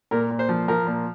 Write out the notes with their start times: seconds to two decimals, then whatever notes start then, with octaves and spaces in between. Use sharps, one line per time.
0.11 A#2 A#4
0.30 A#2
0.39 C5
0.49 F3
0.68 F3 A#4
0.87 A#2